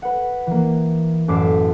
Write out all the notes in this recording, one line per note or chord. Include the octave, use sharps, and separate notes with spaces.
B4 F#5
E3 A#3
A1 F#2 D6 B6 C7 E7